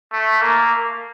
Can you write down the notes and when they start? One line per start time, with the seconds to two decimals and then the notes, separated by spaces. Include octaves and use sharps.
0.12 A3
0.41 A#3